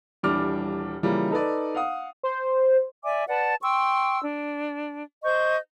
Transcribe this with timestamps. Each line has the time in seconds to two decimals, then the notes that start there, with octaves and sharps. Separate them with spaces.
0.23 D#1 E3 G3 D4 D6 F6
1.03 C#3 E3 F3 G3 A#3
1.31 D#4 A4 B4 D5
1.75 F5 F#5 D#6
2.23 C5
3.03 D5 E5 G#5 D6
3.28 B4 D5 F#5 A5
3.62 G5 C6 C#6 E6
4.22 D4
5.24 C5 D#5 C#6 G6